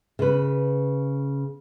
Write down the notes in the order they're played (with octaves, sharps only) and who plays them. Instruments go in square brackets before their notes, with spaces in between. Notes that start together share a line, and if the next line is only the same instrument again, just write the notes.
[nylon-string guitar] C#3 B4